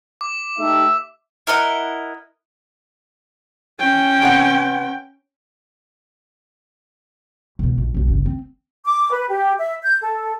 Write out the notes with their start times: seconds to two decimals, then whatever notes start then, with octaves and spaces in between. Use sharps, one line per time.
0.21 D6
0.58 A3 D#4 G4 E5
1.47 E4 A#4 D#5 F#5
3.80 C#4 G5
4.22 C3 B3 F#5
7.59 E1 B2
7.78 A#1
7.94 D#1 B1
8.08 G1 C#3
8.26 C4
8.85 D6
9.10 B4
9.29 G4
9.59 E5
9.83 G6
10.02 A4